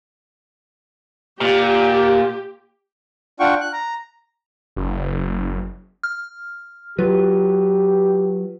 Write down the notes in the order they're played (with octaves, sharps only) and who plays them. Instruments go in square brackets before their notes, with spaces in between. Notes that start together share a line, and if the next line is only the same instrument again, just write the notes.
[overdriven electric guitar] A#2 [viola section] G4
[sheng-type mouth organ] D4 F4 F#5 G5 C#6
F#6
A#5
[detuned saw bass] F#1
[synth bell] F6
[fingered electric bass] F#3 [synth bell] F4 B4 [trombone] G4